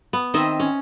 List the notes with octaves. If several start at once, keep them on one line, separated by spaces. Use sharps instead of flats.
B3
D#3 C4 D#5 E5
C#4